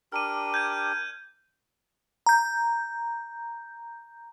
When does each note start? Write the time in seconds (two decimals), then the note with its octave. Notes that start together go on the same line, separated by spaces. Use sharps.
0.12 D4 G4 A#4 F6 D#7
0.54 G6 G#6 D#7
2.26 A#5 G6